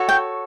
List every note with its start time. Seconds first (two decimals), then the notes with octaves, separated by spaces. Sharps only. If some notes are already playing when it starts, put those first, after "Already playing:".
Already playing: F#4 A4 C#5
0.09 G5